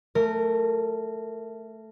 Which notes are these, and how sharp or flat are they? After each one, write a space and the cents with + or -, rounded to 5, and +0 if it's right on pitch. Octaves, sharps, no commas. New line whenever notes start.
A3 +0 A#4 -20